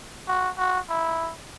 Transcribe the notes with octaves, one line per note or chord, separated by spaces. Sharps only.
F#4
F#4
E4